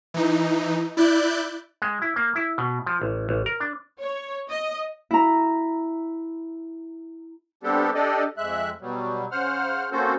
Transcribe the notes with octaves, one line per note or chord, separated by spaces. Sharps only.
E3 D#4
E4 D5 F#6 G6
G#3
E4
A#3
E4
B2
F3
A1
A1
A#4
D4
C#5
D#5
E4 A#5
G3 B3 C4 D4 G4 A4
D4 G4 A4 D5 D#5
F2 G#3 E5 F#6
B2 F#3 G3
C#3 C5 F#5 F6
A#3 C4 C#4 F#4 A4 C5